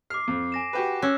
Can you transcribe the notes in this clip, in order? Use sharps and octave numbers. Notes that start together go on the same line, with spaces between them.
D6 F6 C7
F2
G#5 A#6 E7
F#4 G4 B4
C#4 E6 F#6